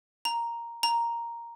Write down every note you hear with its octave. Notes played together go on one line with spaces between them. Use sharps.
A#5
A#5